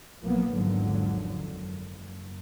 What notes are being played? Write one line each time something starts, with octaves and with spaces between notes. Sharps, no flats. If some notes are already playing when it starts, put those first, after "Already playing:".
A#1 F3 F#3 A#3 B3
G#1 E2 G#2 D3 F3 F#3
F#1